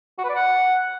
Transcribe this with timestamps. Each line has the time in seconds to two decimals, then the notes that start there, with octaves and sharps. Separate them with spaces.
0.18 F#4
0.24 B4
0.29 D5
0.35 F#5